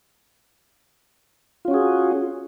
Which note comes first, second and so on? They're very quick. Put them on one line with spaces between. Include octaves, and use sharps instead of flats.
F4 C#4 F#4 G#4